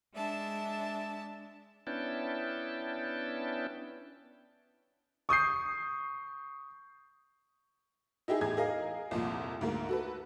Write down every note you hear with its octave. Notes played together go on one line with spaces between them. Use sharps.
G#3 D4 E5 A5
B3 C#4 D4 E4 G5 A5
C#6 D#6 G6 C7
D#4 E4 G4 G#4
E2 A2 G#4 G#6
G#4 A#4 D#5 F5
C2 F2 A#2
D2 G#2 A#3
F#4 A4 B4